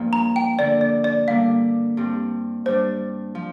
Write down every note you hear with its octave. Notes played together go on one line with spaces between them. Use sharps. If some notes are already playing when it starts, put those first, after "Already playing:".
Already playing: G2 F3 A#3
A#5
G5
D3 A#3 D4 D5
D5
D5
D3 G3 A#3 F5
G2 G3 C4
G2 G3 D4 C5
F3